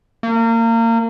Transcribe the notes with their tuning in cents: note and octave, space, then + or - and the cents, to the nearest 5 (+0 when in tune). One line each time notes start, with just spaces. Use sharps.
A#3 -30